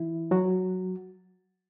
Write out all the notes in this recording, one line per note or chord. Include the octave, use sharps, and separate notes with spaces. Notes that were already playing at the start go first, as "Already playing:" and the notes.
Already playing: E3 E4
F#3 F#4